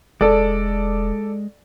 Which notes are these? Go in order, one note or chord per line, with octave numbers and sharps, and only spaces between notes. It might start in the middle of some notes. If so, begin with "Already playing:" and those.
E1 G#3 A4 D5